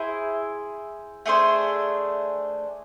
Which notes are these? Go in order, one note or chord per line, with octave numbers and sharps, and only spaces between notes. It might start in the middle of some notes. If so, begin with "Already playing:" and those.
Already playing: E4 G#4 C5
A3 D4 G#4 C5